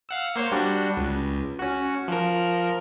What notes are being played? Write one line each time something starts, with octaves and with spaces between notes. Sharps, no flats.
F5 F#5 E6
A#3 C5 C#5
G3 D4 F#4
C#2
C#4 F#4
F3 A#4